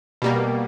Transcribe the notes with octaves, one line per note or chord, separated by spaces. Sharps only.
B2 G3 A#3